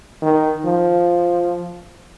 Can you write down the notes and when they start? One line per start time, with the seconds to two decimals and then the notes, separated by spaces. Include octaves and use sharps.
0.22 D#3
0.65 F3